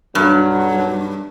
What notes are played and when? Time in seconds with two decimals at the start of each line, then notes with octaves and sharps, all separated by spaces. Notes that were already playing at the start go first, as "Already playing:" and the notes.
0.15 B1 G2 F#3